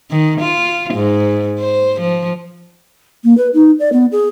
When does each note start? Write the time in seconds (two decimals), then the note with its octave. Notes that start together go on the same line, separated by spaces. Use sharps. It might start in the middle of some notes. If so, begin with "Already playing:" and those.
0.10 D#3
0.41 F4
0.94 G#2
1.58 C5
2.01 F3
3.24 A#3
3.37 B4
3.53 D#4
3.79 D5
3.92 B3
4.12 G#4